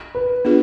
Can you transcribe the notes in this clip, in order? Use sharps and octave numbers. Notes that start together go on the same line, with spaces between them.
B4
B3 D4 F4 G#4